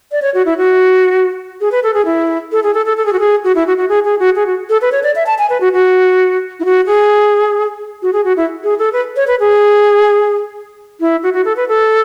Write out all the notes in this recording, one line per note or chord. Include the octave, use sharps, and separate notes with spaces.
D5
C#5
F#4
E4
F#4
G#4
B4
A4
G#4
E4
A4
G#4
A4
A4
A4
G#4
F#4
G#4
F#4
E4
F#4
F#4
G#4
G#4
F#4
G#4
F#4
A4
B4
C#5
D5
E5
A5
G#5
B4
F#4
F#4
E4
F#4
G#4
F#4
G#4
F#4
E4
G#4
A4
B4
C#5
B4
G#4
E4
F#4
F#4
A4
B4
A4